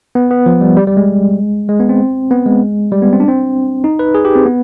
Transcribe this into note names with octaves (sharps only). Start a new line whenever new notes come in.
B3
B3
F3
G3
G3
G3
G#3
G#3
B3
C4
B3
G#3
G3
B3
C4
D4
C4
D#4
B4
G#4
G4
C4
B3